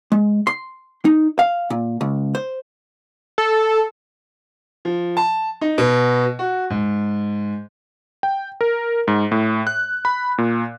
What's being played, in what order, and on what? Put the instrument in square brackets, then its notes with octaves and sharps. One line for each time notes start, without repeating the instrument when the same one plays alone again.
[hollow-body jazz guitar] G#3
C6
D#4
F5
A#2
C#2
C5
[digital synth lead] A4
[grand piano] F3
A5
D#4
B2
F#4
G#2
[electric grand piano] G5
A#4
G#2
A2
F#6
B5
A#2